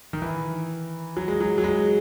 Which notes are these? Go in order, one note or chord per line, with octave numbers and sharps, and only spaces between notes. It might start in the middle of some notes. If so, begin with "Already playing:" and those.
D#3
E3
F#3
G#3
F#3
F#3
G#3